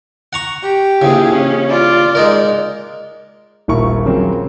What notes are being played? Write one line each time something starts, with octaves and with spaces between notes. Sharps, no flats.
F#5 A#5 C#6
G4
A#1 C#3 E4 G#4
C#4
F4 D5
G#3 D#4 A#4
D#1 A#1 E4 A#4 C#6
C#3 F3 F#3 A#3 C4